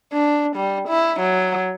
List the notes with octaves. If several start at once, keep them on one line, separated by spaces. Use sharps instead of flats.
D4
G3
E4
F#3